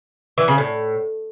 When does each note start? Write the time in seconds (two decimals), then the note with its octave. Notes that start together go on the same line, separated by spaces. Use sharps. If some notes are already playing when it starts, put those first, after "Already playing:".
0.38 E3
0.48 C#3
0.58 A2